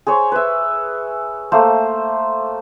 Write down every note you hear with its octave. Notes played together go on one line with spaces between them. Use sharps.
G#4 C5 C#5
B4 E5
A3 A#3 C5